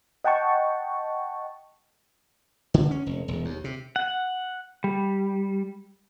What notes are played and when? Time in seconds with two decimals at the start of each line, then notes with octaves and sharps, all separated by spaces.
0.24 D#5 F#5 G5 A5 C#6
2.74 D3
2.91 C#4
3.06 F1
3.28 E1
3.45 D#2
3.64 C3
3.96 F#5
4.84 G3